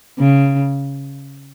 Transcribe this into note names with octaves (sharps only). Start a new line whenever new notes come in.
C#3